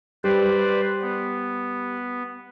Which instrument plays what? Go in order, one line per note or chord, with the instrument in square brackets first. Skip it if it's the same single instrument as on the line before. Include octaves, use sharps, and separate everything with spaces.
[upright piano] G3 [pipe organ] B4 C5 D5
[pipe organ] B3